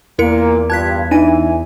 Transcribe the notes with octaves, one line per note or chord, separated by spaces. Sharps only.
E2 A#2 A#3 E4 A#4 C#7
G2 F4 A5 F#6 G#6 B6
E3 D4 D#4 G#5 D#7